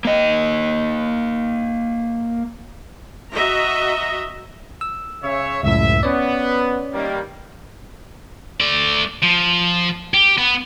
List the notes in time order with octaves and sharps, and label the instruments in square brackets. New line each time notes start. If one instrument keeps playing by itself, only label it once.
[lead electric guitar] A#3 D#5
[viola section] F#4 D#5 E5 A#5
[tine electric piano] E6
[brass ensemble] C#3 C#5 E5
[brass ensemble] F#1 E5 [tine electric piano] C#2 F#2 A2
[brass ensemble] B3 [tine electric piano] C#4 C#5 D5
[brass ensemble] D#3 G3 A#3
[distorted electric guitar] A3 D5
F3
G4
B3